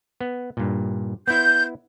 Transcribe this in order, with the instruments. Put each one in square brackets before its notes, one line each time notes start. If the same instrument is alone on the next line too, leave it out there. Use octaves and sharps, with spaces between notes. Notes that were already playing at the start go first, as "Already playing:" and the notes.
[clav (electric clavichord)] B3
G2 A#2
[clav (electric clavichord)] B3 E4 [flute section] G6